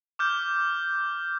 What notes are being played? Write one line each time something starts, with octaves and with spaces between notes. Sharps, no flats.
D6 F6 G6